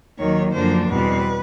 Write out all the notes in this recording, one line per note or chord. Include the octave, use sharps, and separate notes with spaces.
D#2 D#3 F#3 A#3 C#5
F#2 D3 F3 A#3 D4 C5
E2 B2 G3 C4 B4